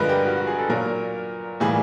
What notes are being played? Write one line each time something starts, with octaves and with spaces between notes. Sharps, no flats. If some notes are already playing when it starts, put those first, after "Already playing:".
Already playing: G2 D3 F3 G#3 A#4 B4
G4
F#4
F#4
G#4
A4
A#2 F#3 A#3 A#4
A2 E3 G3 A#3 G#4